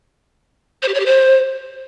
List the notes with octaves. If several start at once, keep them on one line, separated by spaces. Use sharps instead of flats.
C5
G4
C#5
G4
C5